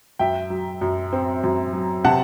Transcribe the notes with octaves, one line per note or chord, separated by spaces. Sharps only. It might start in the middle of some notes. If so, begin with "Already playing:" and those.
F#2 E5 G5
F#3
F#2
C4
F#2
F#3
C3 F#5 A5